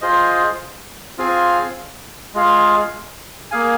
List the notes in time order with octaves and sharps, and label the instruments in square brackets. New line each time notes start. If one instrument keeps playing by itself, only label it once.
[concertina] F4 G#4 C5 D#5
C4 F4 G#4 F5 G#5
G#3 F4 G#4 F5
A#3 G#4 F5 G#5